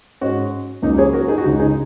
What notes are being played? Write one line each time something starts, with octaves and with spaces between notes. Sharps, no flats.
G#2 G#3 C#4 F#4
C#2 C#3 F#3 A#3 D#4
G#4 C#5
F#4 A#4
D#4 G#4
F#4
C#2 C#3 G#3 D#4 G#4
D#4 G#4